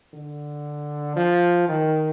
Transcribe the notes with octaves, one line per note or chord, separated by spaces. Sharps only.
D3
F3
D#3